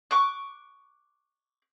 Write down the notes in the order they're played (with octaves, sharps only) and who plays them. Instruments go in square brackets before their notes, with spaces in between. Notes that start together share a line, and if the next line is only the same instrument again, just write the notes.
[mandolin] C#6 D6 F#6